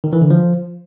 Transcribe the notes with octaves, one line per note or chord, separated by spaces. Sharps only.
D#3
E3
D3
F3